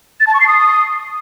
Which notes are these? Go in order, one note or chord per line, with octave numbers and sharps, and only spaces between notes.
A6
A5
C#6
C7
D#6